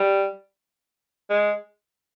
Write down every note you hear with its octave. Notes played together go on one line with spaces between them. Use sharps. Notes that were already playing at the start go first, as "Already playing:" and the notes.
Already playing: G3
G#3